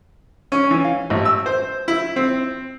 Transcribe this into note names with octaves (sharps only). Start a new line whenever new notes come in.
C#4
E3
F5
A1
E6
C5
E4
C4